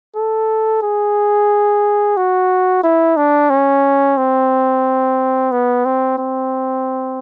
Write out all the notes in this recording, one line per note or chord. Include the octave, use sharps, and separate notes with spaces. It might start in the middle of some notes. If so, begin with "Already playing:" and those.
A4
G#4
F#4
E4
D4
C#4
C4
B3
C4
C4